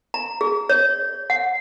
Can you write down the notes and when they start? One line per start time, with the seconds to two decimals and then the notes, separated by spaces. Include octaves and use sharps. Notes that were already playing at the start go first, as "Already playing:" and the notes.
0.14 A#5
0.41 G#4
0.69 C#5
1.30 F#5